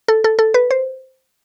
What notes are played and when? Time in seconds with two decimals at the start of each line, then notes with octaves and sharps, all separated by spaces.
0.08 A4
0.24 A4
0.39 A4
0.54 B4
0.71 C5